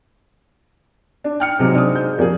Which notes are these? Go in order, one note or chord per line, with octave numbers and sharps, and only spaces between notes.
D4
G5 F6 C#7
G#2 C3 F#3
D4 D#6
G6
F2 A#2 G#4